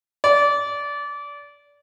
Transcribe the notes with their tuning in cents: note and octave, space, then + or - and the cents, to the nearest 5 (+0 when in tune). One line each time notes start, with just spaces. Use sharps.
D5 -25